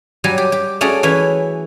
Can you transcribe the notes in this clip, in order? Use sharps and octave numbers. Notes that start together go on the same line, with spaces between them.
F#3 G3 G#5
G4
G4
A3 C#4 F#4 G#4 D5
E3 C#4 E4 B4